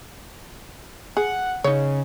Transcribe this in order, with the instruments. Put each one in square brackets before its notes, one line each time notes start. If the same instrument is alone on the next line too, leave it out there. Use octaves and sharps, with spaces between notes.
[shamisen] G#4 [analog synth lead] F#5
[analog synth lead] C#3 [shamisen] D#4 C#5